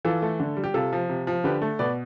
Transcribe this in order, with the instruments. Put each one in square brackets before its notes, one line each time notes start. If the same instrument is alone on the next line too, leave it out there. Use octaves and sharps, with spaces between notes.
[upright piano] E3 F4 A4
A3
D3
G3
G4
C3 F4 A4
F3
C3
F3
D3 G4 B4
A3
B2 B4 D5